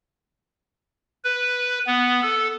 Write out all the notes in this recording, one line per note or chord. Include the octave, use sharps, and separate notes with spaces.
B4
B3
A4